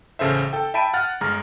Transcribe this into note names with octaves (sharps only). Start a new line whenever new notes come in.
A1 C#3 A4 C5 E5
A4 G5
E5 G5 A5 B5 D7 D#7
F#5 F6 A6
G1 G#3 A#5 F6